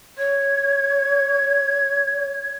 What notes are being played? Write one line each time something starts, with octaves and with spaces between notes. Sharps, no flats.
C#5 G#6